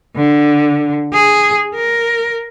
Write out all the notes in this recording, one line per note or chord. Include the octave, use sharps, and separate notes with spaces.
D3
G#4
A#4